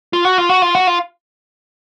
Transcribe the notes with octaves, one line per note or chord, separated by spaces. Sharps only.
F4
F#4
F4
F#4
F4
F#4
F4